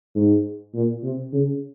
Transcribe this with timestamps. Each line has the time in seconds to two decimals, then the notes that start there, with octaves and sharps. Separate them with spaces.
0.15 G#2
0.74 A#2
1.03 C3
1.32 C#3